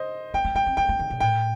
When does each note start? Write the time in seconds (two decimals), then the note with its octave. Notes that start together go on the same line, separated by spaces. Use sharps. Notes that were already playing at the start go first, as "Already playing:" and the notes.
Already playing: C5 D#5
0.34 C4 G5
0.45 C4
0.55 A#3 G5
0.66 C4
0.77 A#3 G5
0.89 A#3
0.99 D3
1.10 C3
1.20 A2 G5